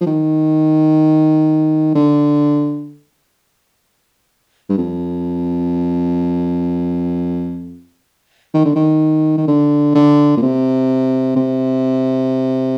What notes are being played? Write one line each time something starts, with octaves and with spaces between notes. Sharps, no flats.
F3
D#3
D3
G2
F2
D#3
D3
D#3
D#3
D3
D3
A#2
C3
C3